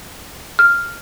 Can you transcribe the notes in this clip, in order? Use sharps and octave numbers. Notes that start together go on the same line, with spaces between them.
F6